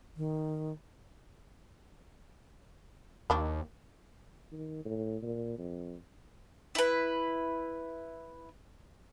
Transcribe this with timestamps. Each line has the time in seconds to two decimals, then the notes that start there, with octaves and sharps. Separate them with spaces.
0.17 D#3
3.30 D#2 D#3 D4 B5
4.52 D#3
4.85 A2
5.23 A#2
5.58 F2
6.75 E4 B4